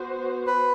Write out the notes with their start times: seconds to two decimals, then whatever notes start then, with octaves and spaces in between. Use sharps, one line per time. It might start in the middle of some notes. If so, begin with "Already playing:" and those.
Already playing: B3 F#4 C5
0.47 B4